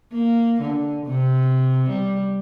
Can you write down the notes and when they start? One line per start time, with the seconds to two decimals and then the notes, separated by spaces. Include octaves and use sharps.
0.12 A#3
0.61 D3
1.06 C3
1.89 G3